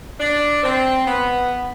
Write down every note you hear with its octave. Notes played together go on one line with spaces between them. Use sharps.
D4
C4
B3